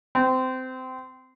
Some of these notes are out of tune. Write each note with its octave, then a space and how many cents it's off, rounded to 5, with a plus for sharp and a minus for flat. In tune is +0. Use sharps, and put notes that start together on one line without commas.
C4 -20